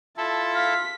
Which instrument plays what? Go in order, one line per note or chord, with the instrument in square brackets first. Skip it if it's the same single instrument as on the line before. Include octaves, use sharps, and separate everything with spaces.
[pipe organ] E4 A4 [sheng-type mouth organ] F4 [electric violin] A5
[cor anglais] F5 [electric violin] B6